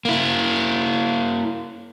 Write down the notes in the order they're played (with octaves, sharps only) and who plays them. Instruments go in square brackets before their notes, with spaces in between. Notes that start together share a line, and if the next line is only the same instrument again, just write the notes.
[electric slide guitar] A#3 E4